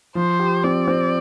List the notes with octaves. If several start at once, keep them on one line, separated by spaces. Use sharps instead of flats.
F3 C5
G4
C4 D5
C4